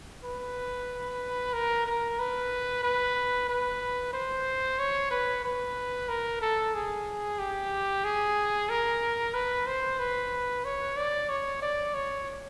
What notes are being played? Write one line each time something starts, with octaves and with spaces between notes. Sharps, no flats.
B4
A#4
A#4
B4
B4
B4
C5
C#5
B4
B4
A#4
A4
G#4
G4
G#4
A#4
B4
C5
B4
C#5
D5
C#5
D5
C#5